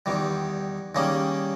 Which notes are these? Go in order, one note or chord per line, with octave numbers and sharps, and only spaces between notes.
E2 D#3 G3
D#3 G3 A#3 C#4 G#4